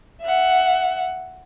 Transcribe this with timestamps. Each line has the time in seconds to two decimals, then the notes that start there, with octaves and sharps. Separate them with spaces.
0.21 E5 F#5